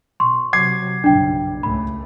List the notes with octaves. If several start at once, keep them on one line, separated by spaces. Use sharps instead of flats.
B2 C6 C#6
C3 F#3 D6 G#6 C7
F#1 B1 G2 D4 G5
C#2 A3 B5